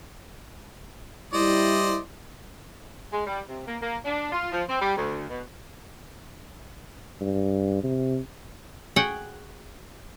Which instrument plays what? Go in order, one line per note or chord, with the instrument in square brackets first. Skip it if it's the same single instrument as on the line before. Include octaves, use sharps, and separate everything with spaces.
[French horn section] G3 E4 [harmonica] C5 D5 D#5
[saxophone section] G#3
G3
C3
A#3
A#3
D4
F4
F3
C4
G3
D2
B2
[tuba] G2
C3
[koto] F#4 G#4 F#5 G5